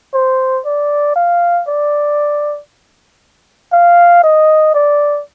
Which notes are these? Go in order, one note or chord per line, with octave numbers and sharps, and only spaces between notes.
C5
D5
F5
D5
F5
D#5
D5